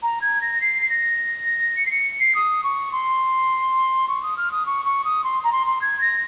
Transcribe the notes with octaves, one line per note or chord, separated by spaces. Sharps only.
A#5
G#6
A#6
C7
C7
A#6
C#7
C7
C#7
C7
D#6
C#6
C6
C#6
D#6
F6
D#6
C#6
C#6
D#6
C6
A#5
C6
C6
G#6
A#6